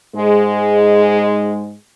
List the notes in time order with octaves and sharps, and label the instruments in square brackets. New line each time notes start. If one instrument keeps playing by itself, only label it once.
[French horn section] G#2 G#3